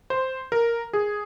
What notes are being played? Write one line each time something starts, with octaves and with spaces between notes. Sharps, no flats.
C5
A#4
G#4